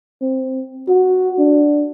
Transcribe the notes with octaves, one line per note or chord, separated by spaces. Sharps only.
C4
F#4
D4